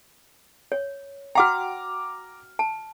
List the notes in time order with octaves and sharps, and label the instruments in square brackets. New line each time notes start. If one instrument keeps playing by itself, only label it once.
[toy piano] C#5
[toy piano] F#4 F#5 G5 [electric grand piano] A#5 D6 F6
[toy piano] A5